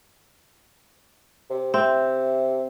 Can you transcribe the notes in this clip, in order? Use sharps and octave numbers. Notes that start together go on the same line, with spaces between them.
C3
C3 C4 E5